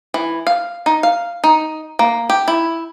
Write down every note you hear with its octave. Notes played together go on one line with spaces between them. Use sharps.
E3
F5
D#4
F5
D#4
A#3
G4
E4